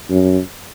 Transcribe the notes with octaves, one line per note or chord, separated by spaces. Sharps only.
F#2